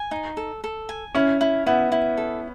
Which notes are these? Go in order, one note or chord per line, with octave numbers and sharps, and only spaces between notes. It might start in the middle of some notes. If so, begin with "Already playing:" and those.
Already playing: G#5
D#4
A4
A4
G#5
C#4 E4
E4
B3 E4
E4
A4